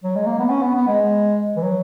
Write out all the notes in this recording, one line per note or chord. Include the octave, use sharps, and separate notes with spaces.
F#3
G#3
A#3
B3
C#4
B3
B3
G#3
E3
F#3